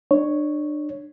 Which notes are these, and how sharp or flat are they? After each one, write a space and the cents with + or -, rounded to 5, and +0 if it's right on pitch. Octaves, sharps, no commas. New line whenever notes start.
D4 +30 C#5 +0